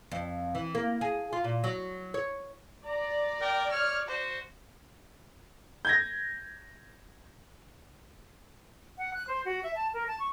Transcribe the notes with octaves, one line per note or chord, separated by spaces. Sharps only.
F2
E3
A#3
G#4
F4
A#2
F#3
C#5
D5 A#5
A#4 G5
C#5 F6
F#4 C5
G6 G#6 A#6
F#5
F#6
C5
F#4
E5
A5
A#4
A5
C#6